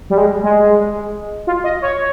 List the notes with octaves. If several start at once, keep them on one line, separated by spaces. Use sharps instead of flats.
G3
G#3
G#3
F4
D#5
C#5